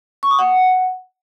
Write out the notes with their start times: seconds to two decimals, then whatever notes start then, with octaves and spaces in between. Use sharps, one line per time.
0.23 C#6
0.31 D#6
0.39 F#5